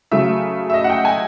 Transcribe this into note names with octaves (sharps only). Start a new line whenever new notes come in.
C#3 F#3 A3 E5
E5
D#5
F#5
G5
G#5